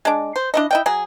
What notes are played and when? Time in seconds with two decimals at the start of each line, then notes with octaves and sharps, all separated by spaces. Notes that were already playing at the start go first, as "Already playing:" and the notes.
0.05 G#3 D4
0.36 C5
0.54 D4 E4 D#5
0.71 E4 D#5 G5
0.86 F#3 G#4